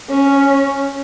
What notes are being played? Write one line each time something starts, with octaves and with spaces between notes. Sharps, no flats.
C#4